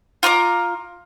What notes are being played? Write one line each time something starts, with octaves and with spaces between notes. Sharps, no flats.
F4 A#5 C#6 D6